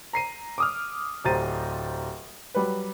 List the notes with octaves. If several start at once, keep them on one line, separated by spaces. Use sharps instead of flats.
A#5 C7 D#7
D6 D#6 F6
D1 G4 C5 A#5 A6 D#7
F#3 G3 B4